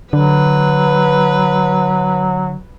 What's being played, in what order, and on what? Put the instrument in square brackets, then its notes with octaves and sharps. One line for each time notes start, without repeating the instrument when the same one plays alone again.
[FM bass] D3 [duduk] F#3 [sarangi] B4